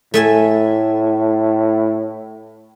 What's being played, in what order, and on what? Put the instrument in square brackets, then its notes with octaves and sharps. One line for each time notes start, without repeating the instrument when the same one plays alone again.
[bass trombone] A2 [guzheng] A3 E5 G#5